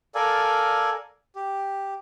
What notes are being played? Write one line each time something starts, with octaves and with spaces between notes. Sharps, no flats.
A4 A#4 D5 F5 G#5
G4